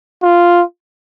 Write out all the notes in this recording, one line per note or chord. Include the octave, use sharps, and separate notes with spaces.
F4